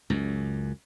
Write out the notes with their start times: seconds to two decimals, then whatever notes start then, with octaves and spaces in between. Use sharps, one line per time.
0.10 C#2 F#2